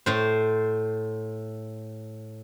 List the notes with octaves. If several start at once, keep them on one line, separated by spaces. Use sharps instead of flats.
A2 C5